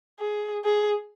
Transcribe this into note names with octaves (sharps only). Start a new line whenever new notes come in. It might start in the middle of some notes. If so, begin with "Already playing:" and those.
G#4
G#4